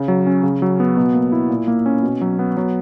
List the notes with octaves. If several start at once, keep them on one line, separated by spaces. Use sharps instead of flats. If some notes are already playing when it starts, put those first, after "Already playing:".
Already playing: C#3
F#3
C#4
C#3
F#3
B3
B2
A#3
E4
A#2
A#3
C#4
B2
F#3
B3
F#3